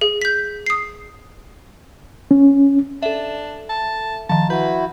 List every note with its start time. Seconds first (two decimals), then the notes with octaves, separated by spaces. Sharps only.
0.01 G#4
0.22 G6 B6
0.66 D#6 C7
2.31 C#4
3.03 D4 A4 E5
3.70 A5
4.30 D#3 F3 A5
4.50 E4 F#4 B4 G6